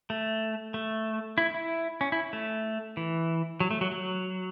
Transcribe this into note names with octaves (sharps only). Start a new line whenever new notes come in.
A3
A3
E4
E4
C#4
E4
A3
E3
F#3
A3
F#3
F#3